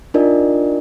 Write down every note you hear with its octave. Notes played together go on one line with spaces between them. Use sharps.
D4 D#4 F4 A#4 D5 D#5